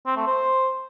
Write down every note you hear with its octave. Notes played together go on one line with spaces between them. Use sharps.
C4
A3
C5